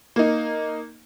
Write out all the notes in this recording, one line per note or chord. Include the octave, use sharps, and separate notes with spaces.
A#3 D#4